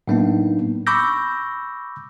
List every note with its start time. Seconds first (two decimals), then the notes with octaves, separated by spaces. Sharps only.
0.08 A2 F#3 A#3 B3 D4 D#4
0.87 B5 C#6 D6 E6 G6 A#6